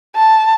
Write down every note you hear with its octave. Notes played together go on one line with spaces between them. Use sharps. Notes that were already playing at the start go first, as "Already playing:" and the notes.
A5